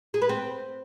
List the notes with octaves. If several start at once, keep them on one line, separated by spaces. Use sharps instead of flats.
G#4
B4
C4